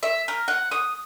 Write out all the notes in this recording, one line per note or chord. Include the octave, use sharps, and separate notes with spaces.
E5
A#4
F#5
D#6